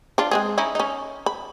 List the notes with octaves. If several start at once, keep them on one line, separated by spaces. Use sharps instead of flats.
D4 F4
G#3 C4 G#4
C#4 D#4 E4
C#4 D#4
B5